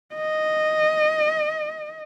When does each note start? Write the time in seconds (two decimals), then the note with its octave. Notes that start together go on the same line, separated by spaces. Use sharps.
0.15 D#5